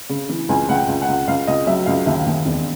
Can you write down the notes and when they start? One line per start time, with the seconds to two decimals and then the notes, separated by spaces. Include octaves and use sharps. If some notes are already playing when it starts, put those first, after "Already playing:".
0.09 C#3
0.29 E3
0.49 C#2 G#5
0.69 C#2 F#5
0.75 G5
0.88 C#2
1.02 F#5
1.08 C#2
1.28 C#2 F5
1.47 C#2 D#5
1.67 F#3 E5
1.86 C#2 F5
2.06 D#2 E5
2.26 D#2
2.45 E1